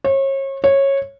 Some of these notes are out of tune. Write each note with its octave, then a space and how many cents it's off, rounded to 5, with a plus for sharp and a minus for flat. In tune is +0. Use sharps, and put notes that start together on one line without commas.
C#5 -35
C#5 -15